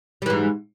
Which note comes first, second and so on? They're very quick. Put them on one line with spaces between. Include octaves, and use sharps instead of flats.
G3 E3 G#2